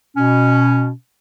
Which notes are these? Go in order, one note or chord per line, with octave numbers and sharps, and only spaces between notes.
B2 C#4